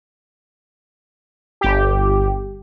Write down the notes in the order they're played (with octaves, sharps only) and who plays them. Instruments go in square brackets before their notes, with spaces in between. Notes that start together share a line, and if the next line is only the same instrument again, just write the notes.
[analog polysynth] G1 G4